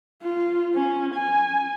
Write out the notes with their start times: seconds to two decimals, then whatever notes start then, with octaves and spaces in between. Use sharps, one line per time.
0.23 F4
0.74 C#4
1.15 G#5